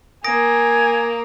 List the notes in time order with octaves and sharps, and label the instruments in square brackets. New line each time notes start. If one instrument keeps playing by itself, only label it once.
[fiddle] A#3 [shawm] G#5 [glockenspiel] D#6 A#6 D7